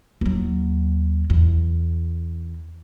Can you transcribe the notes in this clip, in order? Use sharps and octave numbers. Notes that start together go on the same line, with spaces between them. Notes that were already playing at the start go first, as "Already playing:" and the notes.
D#2 F#3
E2